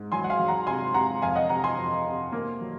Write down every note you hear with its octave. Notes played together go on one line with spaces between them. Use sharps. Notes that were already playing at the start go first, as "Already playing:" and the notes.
Already playing: G#2
F#3 G#5 C6
F#5
F5 G#5
F#3
F#5 A#5
C3 G#5 C6
C3 F#5 A#5
F2 F5 G#5
D#5 F#5
C3 F#5 A#5
G#5 C6
F2
C3
A#3
F#3